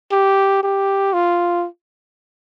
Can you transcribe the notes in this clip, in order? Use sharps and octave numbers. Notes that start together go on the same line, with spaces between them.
G4
G4
F4